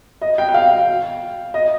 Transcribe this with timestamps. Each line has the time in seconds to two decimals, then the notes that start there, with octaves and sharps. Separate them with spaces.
0.22 D#5
0.38 G5
0.49 G5
0.54 F5
1.54 D#5